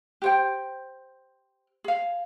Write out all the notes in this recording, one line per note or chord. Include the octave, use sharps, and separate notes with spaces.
G4 C5 G5
G#4 F5